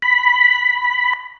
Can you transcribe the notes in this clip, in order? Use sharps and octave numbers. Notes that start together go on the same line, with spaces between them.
B5